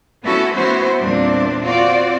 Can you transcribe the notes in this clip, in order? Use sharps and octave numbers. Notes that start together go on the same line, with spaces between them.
A3 B3 C#4 E4 F#4 A4
B3 C#4 E4 F#4 C5
E2 A#2 G3 C4 D4
C4 F4 F#4 D5